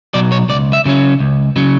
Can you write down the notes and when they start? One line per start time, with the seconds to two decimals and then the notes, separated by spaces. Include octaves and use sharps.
0.14 B2 F#3 D5
0.32 C#5
0.49 C#2 D5
0.73 E5
0.86 C#3 F#3 C#4
1.20 C#2
1.56 C#3 F#3 C#4